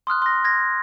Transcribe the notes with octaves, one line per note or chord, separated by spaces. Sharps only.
C6 D#6 F6 F#6
C6 A#6
G#6 A#6